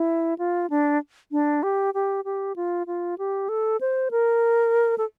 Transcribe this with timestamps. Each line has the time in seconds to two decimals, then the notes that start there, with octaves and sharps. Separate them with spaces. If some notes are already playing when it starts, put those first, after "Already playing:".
Already playing: E4
0.38 F4
0.70 D4
1.32 D4
1.63 G4
1.94 G4
2.25 G4
2.56 F4
2.87 F4
3.18 G4
3.49 A4
3.81 C5
4.11 A#4
4.98 A4